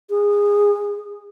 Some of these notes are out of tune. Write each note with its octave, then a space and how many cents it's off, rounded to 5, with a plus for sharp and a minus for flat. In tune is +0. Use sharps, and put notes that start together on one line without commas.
G#4 -20